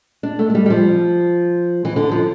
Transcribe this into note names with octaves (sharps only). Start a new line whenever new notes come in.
D4
A3
A3
G3
G3
F3
E3
D3
F3